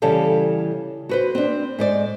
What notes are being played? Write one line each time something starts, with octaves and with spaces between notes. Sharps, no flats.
C#3 E3 G3 G4 A4 F5
F#4 B4 C5
C4 D4
G#2 C5 D5